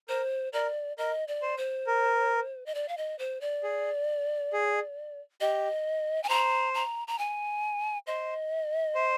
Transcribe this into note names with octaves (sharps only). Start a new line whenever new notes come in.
A#4 C5
A#4 D5
A#4 D#5
D5
C5
C5
A#4
D#5
D5
F5
D#5
C5
D5
G#4
G#4
G4 D#5
G#5
C5 A#5
A#5
A#5
G#5
C5 D#5
C5